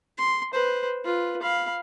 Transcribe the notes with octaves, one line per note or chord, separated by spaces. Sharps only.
C6
B4 C5
F4 B4
F5 B5